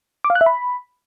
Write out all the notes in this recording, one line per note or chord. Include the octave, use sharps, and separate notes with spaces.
D6
F5
F#6
E5
B5